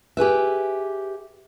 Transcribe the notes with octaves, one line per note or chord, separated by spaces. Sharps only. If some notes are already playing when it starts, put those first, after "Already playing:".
G4 G#4 B4 E5